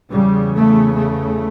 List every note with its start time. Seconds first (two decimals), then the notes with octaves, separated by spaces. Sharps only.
0.12 E2 C#3 G3
0.55 A3
0.96 A3